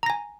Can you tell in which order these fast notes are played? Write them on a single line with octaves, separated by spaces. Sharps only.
A#5 A#6 G#5